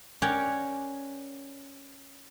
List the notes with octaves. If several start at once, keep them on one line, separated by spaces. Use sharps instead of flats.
C#4 A#4 C#5 D5 F#5 G5